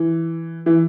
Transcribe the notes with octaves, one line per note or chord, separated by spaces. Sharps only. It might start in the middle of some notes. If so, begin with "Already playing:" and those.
Already playing: E3
E3